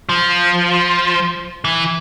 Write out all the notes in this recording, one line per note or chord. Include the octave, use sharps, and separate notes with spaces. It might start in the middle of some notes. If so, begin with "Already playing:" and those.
F3
E3